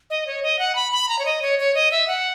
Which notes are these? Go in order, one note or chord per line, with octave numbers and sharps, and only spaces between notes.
D#5
C#5
D#5
F#5
B5
B5
A#5
C#5
D#5
C#5
C#5
D#5
E5
F#5